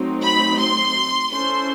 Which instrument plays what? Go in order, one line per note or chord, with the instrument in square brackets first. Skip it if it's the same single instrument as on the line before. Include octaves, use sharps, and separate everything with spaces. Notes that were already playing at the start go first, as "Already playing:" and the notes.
Already playing: [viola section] F#3 A3 C4 D#4
[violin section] B5
C6
[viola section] C#4 E4 A4 C5 [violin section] C6